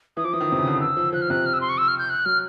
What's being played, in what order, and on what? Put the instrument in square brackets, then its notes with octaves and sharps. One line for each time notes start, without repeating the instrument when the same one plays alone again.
[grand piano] E3 [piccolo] D#6
[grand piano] F3 [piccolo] D6
[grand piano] E3 [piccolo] D#6
[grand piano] D#3
C3
C#3
D3
D#3
[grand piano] E3 [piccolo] E6
[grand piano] F3
[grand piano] F3 [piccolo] F#6
[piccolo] F6
[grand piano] C3 [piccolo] F#6
[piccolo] F6
E6
C6
C#6
E6
F6
G6
F#6
[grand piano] F#3 [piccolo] F6